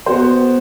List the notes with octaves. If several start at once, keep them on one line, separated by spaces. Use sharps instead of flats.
B3 F#4 C5